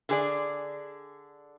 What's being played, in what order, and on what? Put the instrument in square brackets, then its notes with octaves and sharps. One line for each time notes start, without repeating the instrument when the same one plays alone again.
[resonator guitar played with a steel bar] D3 G#4 D5